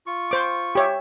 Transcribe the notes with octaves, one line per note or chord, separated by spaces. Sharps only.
F4 C#6
C5 D6
G4 C#5 E5